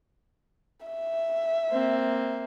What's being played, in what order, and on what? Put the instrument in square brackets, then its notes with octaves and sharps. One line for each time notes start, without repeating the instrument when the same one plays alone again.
[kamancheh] E5
[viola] A#3 C4